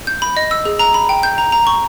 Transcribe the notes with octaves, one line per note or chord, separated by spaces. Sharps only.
G6
B5
D#5
E6
G#4
A#5
B5
G5
G6
A#5
A#5
C#6